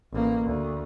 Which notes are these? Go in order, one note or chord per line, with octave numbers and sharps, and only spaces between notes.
A1 A#3
D2